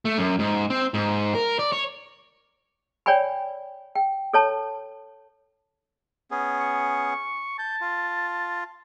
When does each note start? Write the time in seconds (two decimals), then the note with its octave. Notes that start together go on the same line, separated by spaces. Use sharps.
0.05 A3
0.18 F#2
0.39 G#2
0.70 C4
0.94 G#2
1.35 A#4
1.59 D5
1.72 C#5
3.06 C#5 D5 G5 G#5 B5
3.95 G5
4.33 A4 C#5 A5
6.31 B3 C#4 G#4
6.60 C#6
7.59 A5 G6
7.81 F4